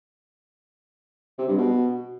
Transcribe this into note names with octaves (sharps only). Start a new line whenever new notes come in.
C3
G2
B2